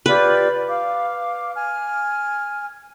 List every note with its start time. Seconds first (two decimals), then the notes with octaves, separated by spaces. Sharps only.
0.06 F4 G4 B4 D5
0.67 F5 D6
1.54 G#5 F6